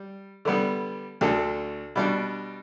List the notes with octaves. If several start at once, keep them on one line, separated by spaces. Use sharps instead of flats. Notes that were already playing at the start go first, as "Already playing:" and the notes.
Already playing: G3
D3 G3 B3
D2 D3 A3 D4 A4
B2 G3 D4